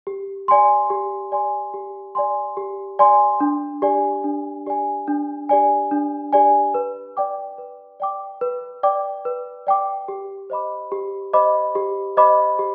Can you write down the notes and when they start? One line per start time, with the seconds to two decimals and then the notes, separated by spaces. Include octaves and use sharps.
0.07 G4
0.48 D5 G#5 C6
0.90 G4
1.32 D5 G#5 C6
1.74 G4
2.15 D5 G#5 C6
2.57 G4
2.99 D5 G#5 C6
3.40 D4
3.82 G4 D5 G#5
4.24 D4
4.66 G4 D5 G#5
5.07 D4
5.49 G4 D5 G#5
5.91 D4
6.33 G4 D5 G#5
6.74 B4
7.17 D5 G5 D6
7.58 B4
8.00 D5 G5 D6
8.41 B4
8.83 D5 G5 D6
9.25 B4
9.67 D5 G5 D6
10.08 G4
10.50 C5 D#5 B5 D6
10.92 G4
11.34 C5 D#5 B5 D6
11.75 G4
12.17 C5 D#5 B5 D6
12.59 G4